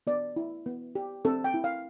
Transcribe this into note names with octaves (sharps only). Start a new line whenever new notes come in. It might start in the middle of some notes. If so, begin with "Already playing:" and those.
B3 D5
E4
B3
G4
C4 A4
G5
E4
F5